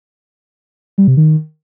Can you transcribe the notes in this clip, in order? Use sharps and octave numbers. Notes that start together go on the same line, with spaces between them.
G3
C3
D#3